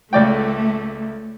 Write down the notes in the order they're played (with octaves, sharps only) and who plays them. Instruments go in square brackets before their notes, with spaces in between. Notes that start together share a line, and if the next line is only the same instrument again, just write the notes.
[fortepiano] C#2 D5 G5 [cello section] A3